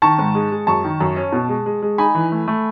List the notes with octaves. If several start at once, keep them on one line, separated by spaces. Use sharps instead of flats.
D#3 A5 C#6
G#2
G#3
G#3
F#2 A5 C#6
D#3
F#2
C#4
B2
G#3
G#3
G#3
D#4 G#5 B5
E3
A3
A3